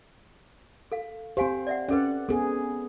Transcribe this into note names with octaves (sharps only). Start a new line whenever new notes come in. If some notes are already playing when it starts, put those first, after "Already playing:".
A4 F5
C4 G4 C5 F5 G#5
D5 E5 F#5
C#4 A4 B4 D5 F#5
B3 G#4 A4